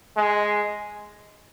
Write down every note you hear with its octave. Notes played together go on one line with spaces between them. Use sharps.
G#3